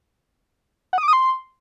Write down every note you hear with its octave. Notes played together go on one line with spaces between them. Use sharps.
F#5
D#6
D6
D#6
C6